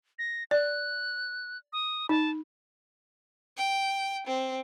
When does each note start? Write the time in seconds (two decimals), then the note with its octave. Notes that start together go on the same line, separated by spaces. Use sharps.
0.19 A#6
0.51 D5 F#6
1.73 D#6
2.09 D#4 A5
3.57 G5
4.27 C4